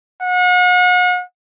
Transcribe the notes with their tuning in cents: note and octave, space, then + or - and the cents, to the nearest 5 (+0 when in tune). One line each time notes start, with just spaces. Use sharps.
F#5 -40